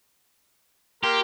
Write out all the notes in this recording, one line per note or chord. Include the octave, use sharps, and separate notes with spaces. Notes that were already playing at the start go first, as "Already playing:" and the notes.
A#3 G4 A#4 C6